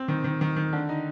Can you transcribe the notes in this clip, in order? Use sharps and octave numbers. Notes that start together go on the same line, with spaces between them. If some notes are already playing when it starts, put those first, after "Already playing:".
Already playing: C4
D#3
D#3
D#3
D#3
D3
D#4